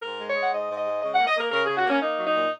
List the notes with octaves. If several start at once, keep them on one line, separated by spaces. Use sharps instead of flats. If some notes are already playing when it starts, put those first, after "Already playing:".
G#2 A#4
G#3
C#5
G#3
F#5
G#2 D#5
G#2
D#5
G#3
C#3 D#5
A#3 F#5
D#5
A#3 A#4
C#3 A#4
C#3 G#4
F#4
A#3 C#4
A#3 D#4
F#3
D#4
A#2